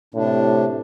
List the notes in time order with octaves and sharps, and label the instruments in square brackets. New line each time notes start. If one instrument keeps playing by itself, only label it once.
[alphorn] A2 [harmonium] C3 D4